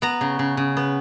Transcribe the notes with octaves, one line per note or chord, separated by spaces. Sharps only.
B3 A#5
C#3
C#3
C#3
B3